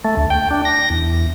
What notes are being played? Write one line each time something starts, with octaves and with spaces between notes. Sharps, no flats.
A3
D2
G5
D4
A#6
E2